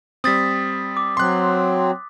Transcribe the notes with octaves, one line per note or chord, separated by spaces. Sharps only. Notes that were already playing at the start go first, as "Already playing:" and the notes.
G3 C4 D#6 A6 B6
D6
F#3 C4 C6 F#6